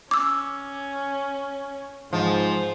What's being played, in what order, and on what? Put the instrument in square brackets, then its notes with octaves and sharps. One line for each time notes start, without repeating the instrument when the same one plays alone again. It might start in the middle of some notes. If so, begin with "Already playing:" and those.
[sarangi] C#4 [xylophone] D6 E6
[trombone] G#2 [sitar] F3 [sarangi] C5